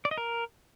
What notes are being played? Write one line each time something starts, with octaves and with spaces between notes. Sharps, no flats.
D5
D#5
A#4